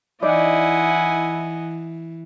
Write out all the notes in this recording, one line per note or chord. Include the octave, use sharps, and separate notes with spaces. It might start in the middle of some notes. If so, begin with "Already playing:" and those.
E3 D#4 E4 D5 D#5 F#5 G#5